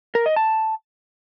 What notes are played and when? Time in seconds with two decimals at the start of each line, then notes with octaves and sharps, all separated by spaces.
0.15 A#4
0.26 D#5
0.36 A5